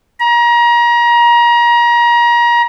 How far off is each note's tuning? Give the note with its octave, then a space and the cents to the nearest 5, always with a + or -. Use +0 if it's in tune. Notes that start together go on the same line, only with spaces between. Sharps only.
A#5 +30